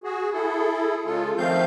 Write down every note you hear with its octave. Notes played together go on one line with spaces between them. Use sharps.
F#4 G#4
E4 G#4 A4
C#3 G#3 F4 A4
D#3 F3 A3 C4 F5 G6